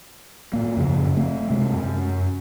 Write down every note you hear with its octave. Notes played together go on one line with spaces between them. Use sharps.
A2 A#3
F#2 C#3 F3
A3 C4
C3 G#3
F#2